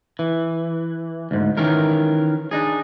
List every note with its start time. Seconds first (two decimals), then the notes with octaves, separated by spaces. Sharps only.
0.19 E3
1.31 D2 G#2
1.57 D#3 E3 C#4 A#4
2.51 D4 D#4 G#4